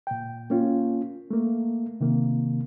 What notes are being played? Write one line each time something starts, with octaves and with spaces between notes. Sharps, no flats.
A#2 G5
A#3 C#4 F4
A3 A#3
C3 D#3 A#3